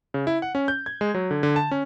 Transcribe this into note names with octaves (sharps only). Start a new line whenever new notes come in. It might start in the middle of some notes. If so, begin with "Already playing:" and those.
C#3
E4
F#5
C#4
G6
G#6
G#3
F#3
D3
D3
A5
C#4